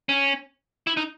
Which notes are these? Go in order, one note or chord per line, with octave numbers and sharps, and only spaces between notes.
C#4
E4
D#4